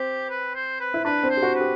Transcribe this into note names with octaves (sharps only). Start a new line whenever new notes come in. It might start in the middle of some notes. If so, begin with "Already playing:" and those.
Already playing: C4 G4
B4
C5
B4
E4
D4 B4
C4
C5
G4
F#4
B4
G4